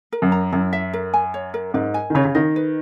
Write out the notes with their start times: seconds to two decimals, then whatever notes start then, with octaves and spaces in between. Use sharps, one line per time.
0.13 A#4
0.22 F#2
0.32 A#5
0.53 F#2 E4
0.73 E5
0.93 A#4
1.14 G#5
1.34 C#5
1.54 A#4
1.74 G#2 A#4
1.94 G#5
2.10 D#3
2.15 C#3 C#5
2.25 C#3
2.35 D#3 D#5
2.56 B4